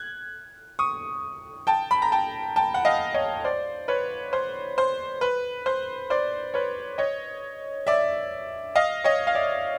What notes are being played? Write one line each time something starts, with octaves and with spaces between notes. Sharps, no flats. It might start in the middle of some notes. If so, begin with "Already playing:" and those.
Already playing: F#6 G#6
C#6 D#6
G5 A5
B5
A#5
G5 A5
G5 A5
F#5
D#5 F5
C#5 D#5
C5 D5
B4 C#5
C5
C5
B4
C5
C5 D5
B4 C#5
C#5 D#5
D5 E5
D#5 F5
C#5 D#5
F5
D5 E5